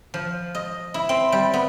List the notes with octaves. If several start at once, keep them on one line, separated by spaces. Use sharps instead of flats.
F3
D#5
E4
C4
G3
B3